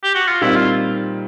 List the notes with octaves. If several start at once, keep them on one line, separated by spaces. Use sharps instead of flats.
G4
F#4
F4
A#2 G3 C4 D#4 E4
F4